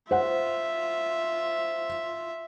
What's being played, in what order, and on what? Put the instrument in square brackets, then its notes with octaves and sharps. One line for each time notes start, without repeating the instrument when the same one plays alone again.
[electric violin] F4 E5 [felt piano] C5 F#5